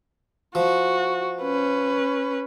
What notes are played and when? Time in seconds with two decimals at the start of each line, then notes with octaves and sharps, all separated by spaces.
0.55 F3 F#4
1.42 C#4 B4